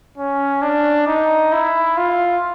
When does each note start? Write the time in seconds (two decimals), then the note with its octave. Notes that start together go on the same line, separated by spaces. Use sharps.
0.18 C#4
0.63 D4
1.07 D#4
1.53 E4
1.97 F4